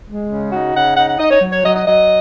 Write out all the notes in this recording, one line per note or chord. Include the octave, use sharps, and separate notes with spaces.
G#3
C#3
D#4 F#4
C#3 F#5
D#4 F#5
F#5
D#4 D#5
C#5
F#3
C#5
F#3 D#5
D#5
F#3 D#5